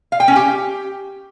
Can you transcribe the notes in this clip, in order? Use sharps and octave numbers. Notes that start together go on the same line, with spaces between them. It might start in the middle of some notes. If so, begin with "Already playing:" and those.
F5
G5
C#4
G4